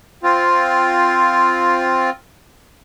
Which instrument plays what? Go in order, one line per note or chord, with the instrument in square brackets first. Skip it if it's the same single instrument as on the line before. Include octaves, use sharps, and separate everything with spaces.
[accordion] C4 F4